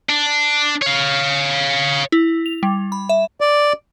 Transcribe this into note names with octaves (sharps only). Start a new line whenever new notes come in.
D4
C#5 F5
E4
F7
G3
B5
E5
D5